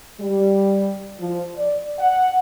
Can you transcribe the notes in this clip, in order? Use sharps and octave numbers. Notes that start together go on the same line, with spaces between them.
G3
F3
D5
F#5